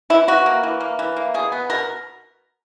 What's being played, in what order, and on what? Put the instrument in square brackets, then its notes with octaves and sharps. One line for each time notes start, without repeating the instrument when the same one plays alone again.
[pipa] E3 E4
E3 F#4
A#3
E3
A#3
E3
A#3
B2 G#4
B3
B2 A#4